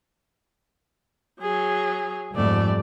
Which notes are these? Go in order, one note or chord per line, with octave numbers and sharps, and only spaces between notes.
F#3 G#4
F2 G#2 G3 A3 D5